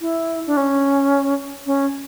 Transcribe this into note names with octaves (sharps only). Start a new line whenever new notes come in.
E4
D4
C#4
C#4